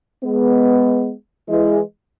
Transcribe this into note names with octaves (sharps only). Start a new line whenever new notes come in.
G#3 B3
E3 G#3